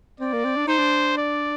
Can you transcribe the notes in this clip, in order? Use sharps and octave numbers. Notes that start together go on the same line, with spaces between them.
C4 D5
A#3
C4
D4
D#4 C5
D4
D5